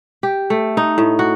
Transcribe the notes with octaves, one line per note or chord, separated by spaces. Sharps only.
G4
A3
D#4
A2
F#4